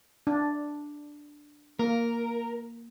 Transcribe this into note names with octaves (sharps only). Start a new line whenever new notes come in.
D4
A#3 A#4